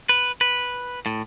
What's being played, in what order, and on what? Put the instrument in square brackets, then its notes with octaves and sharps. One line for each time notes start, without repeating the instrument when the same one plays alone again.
[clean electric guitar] B4
B4
A2